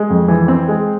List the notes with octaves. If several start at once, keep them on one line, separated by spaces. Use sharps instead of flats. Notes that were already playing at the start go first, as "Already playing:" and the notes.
Already playing: G#3
F2
E3
C4
G#3